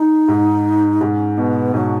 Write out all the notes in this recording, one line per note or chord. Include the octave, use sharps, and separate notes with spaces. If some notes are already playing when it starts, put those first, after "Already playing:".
Already playing: D#4
G#2
G#2 C#4
B2 B3
G#2 F#3